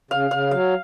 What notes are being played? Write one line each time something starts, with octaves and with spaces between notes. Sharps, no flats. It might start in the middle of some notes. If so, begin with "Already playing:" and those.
C#3 F5
C#3 F5
F#3 F5